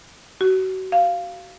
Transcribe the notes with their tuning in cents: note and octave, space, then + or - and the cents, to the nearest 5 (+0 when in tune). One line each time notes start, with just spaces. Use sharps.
F#4 +30
F5 -5